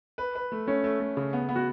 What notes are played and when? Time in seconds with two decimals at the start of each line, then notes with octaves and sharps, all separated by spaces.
0.18 B4
0.35 B4
0.52 A3
0.67 A3 C#4
0.84 A3
1.00 A3
1.17 C#3
1.33 B3
1.49 B3
1.56 F#4